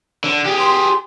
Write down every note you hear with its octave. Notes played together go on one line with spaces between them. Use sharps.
D3
G4 G#4
C6